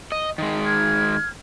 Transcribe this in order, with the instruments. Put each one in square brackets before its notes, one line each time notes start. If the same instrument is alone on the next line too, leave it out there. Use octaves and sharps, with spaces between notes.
[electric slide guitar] D#5
D#3 G#3
[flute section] F6 G#6